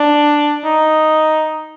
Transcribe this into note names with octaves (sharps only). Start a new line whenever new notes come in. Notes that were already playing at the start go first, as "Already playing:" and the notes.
Already playing: D4
D#4